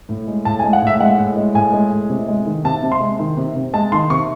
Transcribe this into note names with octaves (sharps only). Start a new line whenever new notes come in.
A2
G#3
A2 A5
G#5
G#3
F#5
A2 E5
G#3 F#5
A2
G#3
A2 G#5
G#3
A2
C3
G#3
D#3
C3 A5
C3
C6
G#3
D#3
C3
C3
G#3 A5
D#3 C6
C3 C#6